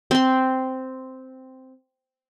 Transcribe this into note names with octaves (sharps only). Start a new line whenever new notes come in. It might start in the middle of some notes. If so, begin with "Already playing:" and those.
C4 C6